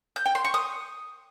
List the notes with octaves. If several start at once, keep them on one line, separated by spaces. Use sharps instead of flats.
G6
G5
C6
C#6
D#6